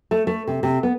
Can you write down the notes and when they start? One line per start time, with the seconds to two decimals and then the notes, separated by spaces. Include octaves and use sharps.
0.11 A3
0.27 A3
0.47 C3
0.63 C3
0.83 B3